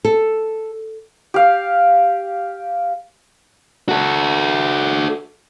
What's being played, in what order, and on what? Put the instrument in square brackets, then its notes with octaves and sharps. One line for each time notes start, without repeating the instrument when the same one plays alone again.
[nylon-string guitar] A4
[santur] G4 F5
[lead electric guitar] F#4 A4